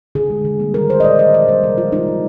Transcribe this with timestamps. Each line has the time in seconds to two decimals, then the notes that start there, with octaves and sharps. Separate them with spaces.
0.15 D3 G#4
0.30 G#3
0.45 D3
0.59 G3 A#3
0.74 D#3 A#4
0.90 G#3 C5
1.00 D#5
1.04 A#2 D5
1.18 F3 A#3 D#5
1.33 D3 D5
1.48 G3 A#3 C5
1.63 C3 A#4
1.78 F3 G#3 F4
1.92 D3 D#4
2.08 G3 A#3